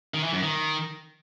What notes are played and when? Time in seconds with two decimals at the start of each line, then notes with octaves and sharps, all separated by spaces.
0.14 D#3
0.24 E3
0.33 F#2
0.43 D#3